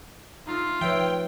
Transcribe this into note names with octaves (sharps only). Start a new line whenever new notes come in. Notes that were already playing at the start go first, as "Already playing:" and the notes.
A3 D#4 F4
F3 B4 C#5 E5 G5